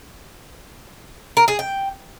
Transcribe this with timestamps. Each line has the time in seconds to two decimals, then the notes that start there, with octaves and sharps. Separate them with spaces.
1.37 A#4
1.48 G#4
1.59 G5